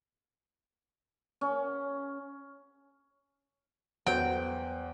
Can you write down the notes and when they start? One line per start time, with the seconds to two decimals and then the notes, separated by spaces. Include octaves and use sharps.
1.41 C#4
4.06 E2 F#3 B4 C5 F#5 G5